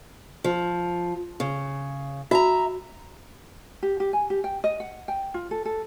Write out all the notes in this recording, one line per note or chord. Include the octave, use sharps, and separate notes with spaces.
F3
C#3
F#4 E5 A5 A#5
G4
G4
G#5
G4
G5
D#5
F#5
G5
F4
A4
A4